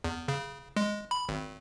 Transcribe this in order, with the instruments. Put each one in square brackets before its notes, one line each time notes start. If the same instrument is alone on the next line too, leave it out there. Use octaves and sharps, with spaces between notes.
[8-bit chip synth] E2
C#3
G#3
B5
G#1